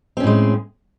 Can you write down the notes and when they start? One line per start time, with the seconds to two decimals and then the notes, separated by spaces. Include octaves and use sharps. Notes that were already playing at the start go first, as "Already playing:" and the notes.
0.17 C4
0.20 C#4
0.23 A2
0.27 G#3